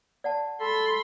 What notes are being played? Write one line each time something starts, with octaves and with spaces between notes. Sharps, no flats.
D5 F#5 A5
A4 B5 C6